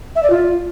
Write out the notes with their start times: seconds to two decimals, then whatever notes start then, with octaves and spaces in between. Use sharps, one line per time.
0.16 E5
0.23 D5
0.30 F4